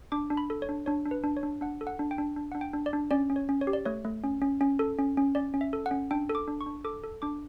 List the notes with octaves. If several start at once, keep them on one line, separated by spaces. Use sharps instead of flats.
D4 D6
D4
B5
A4
C#5
D4
D4 C#5
D4
B4
D4
C#5
D4
D4 F#5
A4
F#5
D4
G5
D4
D4
D4 F#5
G5
D4
D5
D4
C#4 D5
C#4
C#5
C#4
C#5
G4
D5
A3 C#5
A3
C#4
C#4
C#4
A4
C#4
C#4
C#4 D5
C#4
E5
A4
F#5
C#4
D4 G5
A4
D6
D4
C#6
D4
A4 D6
A4
D4 D6